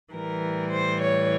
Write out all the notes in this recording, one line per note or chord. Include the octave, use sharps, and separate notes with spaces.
A2 E3 G3 A#4
C5
C#5